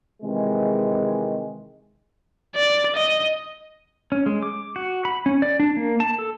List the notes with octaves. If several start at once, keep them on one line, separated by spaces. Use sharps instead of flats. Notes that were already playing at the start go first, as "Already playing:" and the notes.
C3 D#3 E3 G#3
D5
D#5
C#4
G#3
D6
F#4
B5
C#4
D5
D4
A#3
A5
A4